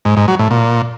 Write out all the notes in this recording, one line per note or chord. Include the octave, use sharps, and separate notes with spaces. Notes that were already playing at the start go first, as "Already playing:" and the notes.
G#2
G#2
F#3
A2
A#2